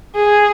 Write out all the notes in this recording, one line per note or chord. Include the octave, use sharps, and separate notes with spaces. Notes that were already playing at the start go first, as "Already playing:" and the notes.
G#4